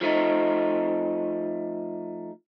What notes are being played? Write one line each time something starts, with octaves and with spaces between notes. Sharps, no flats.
F3 A3 D#4